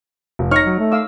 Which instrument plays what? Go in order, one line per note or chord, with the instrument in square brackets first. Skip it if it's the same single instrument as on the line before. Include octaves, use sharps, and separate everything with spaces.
[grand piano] F1
[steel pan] D#4 C#5 C#6 [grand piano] F6 A#6
[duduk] F#3
A3
[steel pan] F5 D6 E6